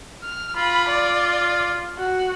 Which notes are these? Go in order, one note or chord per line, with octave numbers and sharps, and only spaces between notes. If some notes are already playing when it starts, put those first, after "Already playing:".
F6
F4 B5
D5
F#4